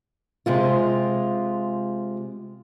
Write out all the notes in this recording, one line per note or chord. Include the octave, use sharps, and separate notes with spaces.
C3 G#3 F4